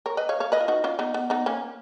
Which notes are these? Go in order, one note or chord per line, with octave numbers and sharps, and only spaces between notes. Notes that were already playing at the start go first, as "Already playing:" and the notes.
A#4 C#5
B4 D#5
C#5 F5
C#5 F5
B4 D#5
F4
D#4 F#4
C#4 F4
B3 D#4
B3
B3 D#4
A#3 C#4